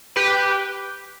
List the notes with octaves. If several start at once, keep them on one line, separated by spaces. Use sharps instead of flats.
G4 B4